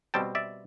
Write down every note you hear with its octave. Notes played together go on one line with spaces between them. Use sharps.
B2 G3 C4 G5 A5
D5 E5